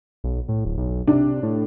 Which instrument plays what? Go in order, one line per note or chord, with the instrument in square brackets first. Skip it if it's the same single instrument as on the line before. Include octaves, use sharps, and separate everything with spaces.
[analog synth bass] B1
A2
D1
B1
[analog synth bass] C3 [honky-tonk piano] D4
[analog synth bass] A2